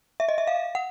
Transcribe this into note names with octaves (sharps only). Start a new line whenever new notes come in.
E5
D#5
E5
F5
F#5